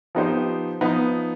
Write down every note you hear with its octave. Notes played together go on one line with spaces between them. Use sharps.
F3 B3 D#4 G4 C5
F3 B3 D#4